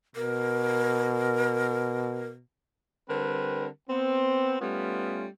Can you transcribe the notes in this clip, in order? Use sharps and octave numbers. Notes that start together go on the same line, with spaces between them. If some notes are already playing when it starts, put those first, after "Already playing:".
B2 A#4
D3 G3 C4 A#4 B4
B3 C4
G3 A3 B3 C#4 F4